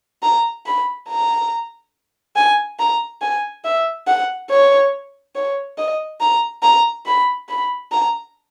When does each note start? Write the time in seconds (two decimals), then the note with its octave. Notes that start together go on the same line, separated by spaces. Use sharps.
0.23 A#5
0.66 B5
1.09 A#5
2.36 G#5
2.79 A#5
3.21 G#5
3.64 E5
4.07 F#5
4.50 C#5
5.36 C#5
5.78 D#5
6.21 A#5
6.63 A#5
7.06 B5
7.49 B5
7.92 A#5